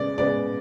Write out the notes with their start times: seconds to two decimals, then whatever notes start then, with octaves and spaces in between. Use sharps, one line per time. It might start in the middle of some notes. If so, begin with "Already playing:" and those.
Already playing: C#3 G#3 B3 D5
0.18 C#3 G#3 B3 D5